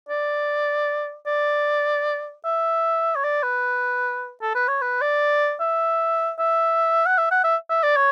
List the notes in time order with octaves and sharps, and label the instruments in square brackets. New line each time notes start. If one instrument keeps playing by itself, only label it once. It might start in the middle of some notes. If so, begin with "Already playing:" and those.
[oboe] D5
D5
E5
C#5
D5
B4
A4
B4
C#5
B4
D5
E5
E5
F#5
E5
F#5
E5
E5
D5
C#5